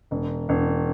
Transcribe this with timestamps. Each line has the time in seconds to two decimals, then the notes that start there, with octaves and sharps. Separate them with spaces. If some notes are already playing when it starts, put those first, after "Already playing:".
0.11 E1
0.49 E1